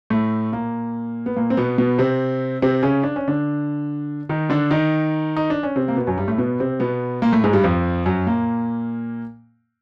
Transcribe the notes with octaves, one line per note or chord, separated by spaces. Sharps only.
A2 A3
A#2 A#3
B3
A#2 A#3
C4
B2 B3
B2 B3
C3 C4
C3 C4
C#3 C#4
D4
C#4
D3 D4
D#3 D#4
D3 D4
D#3 D#4
D#4
D4
C#4
C3 C4
A#3
B2 B3
F#2 F#3
G2 G3
A2 A3
B2 B3
C3 C4
B2 B3
A#2 A#3
A2 A3
G#2 G#3
G2 G3
F2 F3
F#2 F#3
A#2 A#3